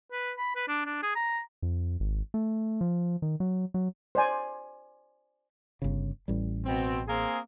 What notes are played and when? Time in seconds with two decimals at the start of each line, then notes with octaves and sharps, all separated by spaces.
0.12 B4
0.38 B5
0.56 B4
0.68 D4
0.86 D4
1.03 G#4
1.16 A#5
1.62 F2
2.00 G#1
2.34 A3
2.81 F3
3.22 D#3
3.40 F#3
3.74 F#3
4.15 C5 D5 G#5
5.82 G1 C#3
6.28 A1 G3
6.65 B2 C4
7.06 A#3 C4 G#4